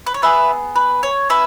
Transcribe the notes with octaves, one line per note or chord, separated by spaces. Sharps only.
B4
C#5
B3 G#4 B4 E5
B4
C#5
C#4 B4 E5